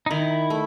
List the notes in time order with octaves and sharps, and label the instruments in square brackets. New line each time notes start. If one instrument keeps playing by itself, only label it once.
[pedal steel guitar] D#4
[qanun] D#3 [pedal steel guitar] E4
[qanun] A3